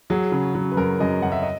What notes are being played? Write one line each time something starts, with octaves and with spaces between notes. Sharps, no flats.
F#3 G#4
C#3
F#3
B4
F#2 A#4
F#2 D#5
F#2 F#5
E5
D#5